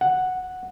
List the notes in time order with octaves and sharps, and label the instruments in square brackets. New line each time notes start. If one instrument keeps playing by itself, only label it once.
[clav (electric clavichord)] F#5